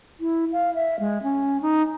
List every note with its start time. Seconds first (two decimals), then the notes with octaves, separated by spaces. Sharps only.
0.20 E4
0.52 F5
0.75 E5
1.00 G#3
1.23 C#4
1.62 D#4